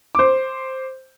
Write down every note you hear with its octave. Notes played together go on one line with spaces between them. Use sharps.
C5 D6